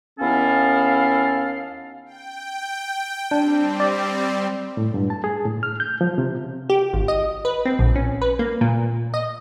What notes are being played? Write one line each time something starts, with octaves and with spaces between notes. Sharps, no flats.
D#2 B3 C#4 E4 A4 F5
G5
G3 C4 D4
D5
A2
G2
A5
G#4
A2
F6
G6
F3
C3
G4
G#1
D#5
B4
C4
A#1
C#4
B4
A#3
A#2
D#5